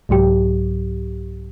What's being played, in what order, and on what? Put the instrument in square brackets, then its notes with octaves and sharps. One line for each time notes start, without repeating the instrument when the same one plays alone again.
[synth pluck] C2 G#2 F#3 G4